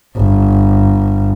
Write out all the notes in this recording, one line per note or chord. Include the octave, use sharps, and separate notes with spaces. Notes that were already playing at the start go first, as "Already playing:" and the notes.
G1